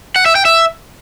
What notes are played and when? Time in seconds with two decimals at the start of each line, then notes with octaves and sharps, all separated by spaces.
0.16 F#5
0.26 E5
0.35 G5
0.45 E5